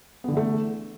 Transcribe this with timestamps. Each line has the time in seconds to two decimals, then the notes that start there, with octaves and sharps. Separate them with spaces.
0.24 B3
0.28 D3
0.33 E3
0.37 A3